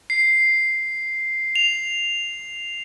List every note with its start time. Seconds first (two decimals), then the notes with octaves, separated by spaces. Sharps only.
0.10 C7
1.56 F7